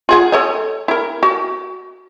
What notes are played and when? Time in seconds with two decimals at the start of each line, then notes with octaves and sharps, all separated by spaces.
0.09 F4 G#4 F#5
0.32 A4 C#5 D#5
0.88 E4 A#4
1.23 F#4